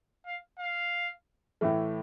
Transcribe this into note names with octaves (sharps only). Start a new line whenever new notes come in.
F5
F5
A2 E3 A3